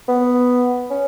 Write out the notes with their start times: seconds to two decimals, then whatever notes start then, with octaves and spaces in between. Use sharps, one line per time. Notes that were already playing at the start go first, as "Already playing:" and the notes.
0.08 B3
0.90 C#4